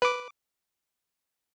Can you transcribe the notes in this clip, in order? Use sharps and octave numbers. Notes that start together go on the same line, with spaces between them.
B4 D6